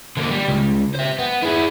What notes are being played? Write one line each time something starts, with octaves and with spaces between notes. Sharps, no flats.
D3 A#3
G3
C#2
C5 E5
B3
E4 G#4